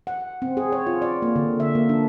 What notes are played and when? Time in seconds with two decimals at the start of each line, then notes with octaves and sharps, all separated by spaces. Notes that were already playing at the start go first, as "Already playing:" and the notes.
0.07 F#5
0.42 C4
0.57 G#4
0.72 C#5
0.87 F4
1.02 D5
1.22 A#3
1.36 D3
1.60 E5
1.75 A#3
1.89 D4